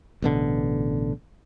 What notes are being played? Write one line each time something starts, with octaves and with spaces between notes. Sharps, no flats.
A1 B2 D3